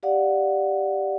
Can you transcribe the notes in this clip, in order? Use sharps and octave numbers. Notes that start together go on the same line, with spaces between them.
G4 D5 F5 F#5